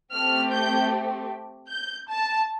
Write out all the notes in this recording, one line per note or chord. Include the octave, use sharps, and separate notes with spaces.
A3 C4 G4 F6
G6
G6
A5